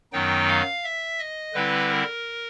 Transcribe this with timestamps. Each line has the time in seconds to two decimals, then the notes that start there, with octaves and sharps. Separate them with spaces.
0.12 F#2 D#3 F#3 B3 D#4 G5
0.48 F5
0.84 E5
1.19 D#5
1.54 D3 G3 C4 E4 B4
1.89 A#4